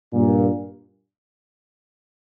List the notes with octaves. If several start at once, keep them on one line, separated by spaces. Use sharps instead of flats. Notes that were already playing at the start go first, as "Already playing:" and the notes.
G2 A#2